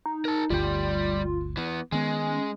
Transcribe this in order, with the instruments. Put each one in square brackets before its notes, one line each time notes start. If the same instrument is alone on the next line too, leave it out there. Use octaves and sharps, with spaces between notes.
[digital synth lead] D#4
[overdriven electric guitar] A#4 A5
[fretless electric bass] G1 D2 [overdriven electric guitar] G3 G4 [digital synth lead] F4
[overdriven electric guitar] E3 B3
[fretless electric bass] D#3 B3 [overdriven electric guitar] G#3 [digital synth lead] C#4